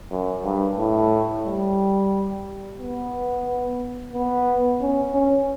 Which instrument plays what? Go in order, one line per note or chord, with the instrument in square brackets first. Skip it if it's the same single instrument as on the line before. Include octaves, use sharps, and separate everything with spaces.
[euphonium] F#2
G2
A2
G3
B3
B3
C#4
C#4